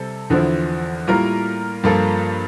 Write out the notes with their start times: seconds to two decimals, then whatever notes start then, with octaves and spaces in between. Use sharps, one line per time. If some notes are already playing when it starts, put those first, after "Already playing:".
Already playing: C3 G3 C4 A4
0.30 E2 D3 F3 C4 E4
1.07 A2 G3 A#3 F4 A#4
1.83 G2 F3 A#3 F4 A4